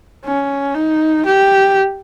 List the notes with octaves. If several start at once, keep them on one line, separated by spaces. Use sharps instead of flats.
C#4
D#4
G4